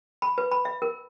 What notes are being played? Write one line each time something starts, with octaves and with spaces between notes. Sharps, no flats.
B5
B4
B5
E5
A#4